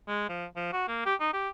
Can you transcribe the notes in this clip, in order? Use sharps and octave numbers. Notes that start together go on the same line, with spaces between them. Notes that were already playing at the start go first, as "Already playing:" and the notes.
G#3
F3
F3
F#4
A#3
G4
D#4
G4